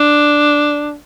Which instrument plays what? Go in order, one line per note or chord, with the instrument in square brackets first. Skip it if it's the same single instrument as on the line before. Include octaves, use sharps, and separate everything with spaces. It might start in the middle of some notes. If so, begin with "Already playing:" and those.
Already playing: [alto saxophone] D4